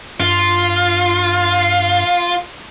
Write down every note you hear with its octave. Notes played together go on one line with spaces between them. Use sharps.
G2 F4